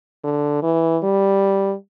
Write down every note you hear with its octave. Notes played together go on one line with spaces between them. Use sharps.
D3
E3
G3